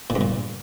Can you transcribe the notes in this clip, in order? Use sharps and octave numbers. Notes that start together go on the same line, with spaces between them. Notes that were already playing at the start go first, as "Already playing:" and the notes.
A#2
G2
A#2